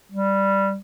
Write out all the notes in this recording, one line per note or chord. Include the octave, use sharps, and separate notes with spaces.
G3